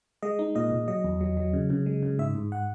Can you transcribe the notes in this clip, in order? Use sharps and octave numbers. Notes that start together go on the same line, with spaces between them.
G#3 D#5
D#4
A#2 D#5
A#2
F#3 D#5
E2
F#3
F#3
C#3
C#3
G#3
C#3
G#2 E5
G#2
F#5